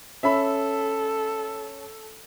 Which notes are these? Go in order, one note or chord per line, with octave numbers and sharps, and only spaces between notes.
C#4 A4 E5 B5